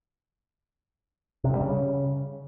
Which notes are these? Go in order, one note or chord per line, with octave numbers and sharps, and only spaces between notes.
C3
G2
G3
C#3